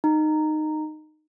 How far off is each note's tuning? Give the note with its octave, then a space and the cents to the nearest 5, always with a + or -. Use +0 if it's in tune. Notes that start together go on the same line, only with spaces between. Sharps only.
D#4 -15